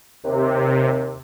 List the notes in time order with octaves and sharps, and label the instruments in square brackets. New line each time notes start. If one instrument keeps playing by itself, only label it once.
[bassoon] D#2 [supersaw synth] C3